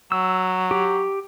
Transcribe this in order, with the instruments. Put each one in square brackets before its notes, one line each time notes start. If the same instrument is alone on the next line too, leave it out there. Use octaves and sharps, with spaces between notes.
[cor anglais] F#3 [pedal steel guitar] E6
[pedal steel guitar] G4